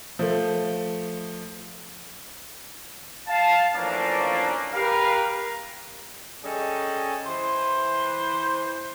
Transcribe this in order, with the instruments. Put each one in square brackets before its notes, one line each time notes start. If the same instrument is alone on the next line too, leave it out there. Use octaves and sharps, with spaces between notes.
[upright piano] F3 A3
[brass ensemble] F5 A5
E3 F3 A3 A#3 C#4 D4
G4 A#4 B4 F5
[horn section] G3 C#4 G#4 A4 D#5
E3 C5